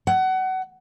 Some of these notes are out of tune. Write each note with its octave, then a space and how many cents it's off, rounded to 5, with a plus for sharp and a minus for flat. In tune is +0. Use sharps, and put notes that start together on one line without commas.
F#5 +25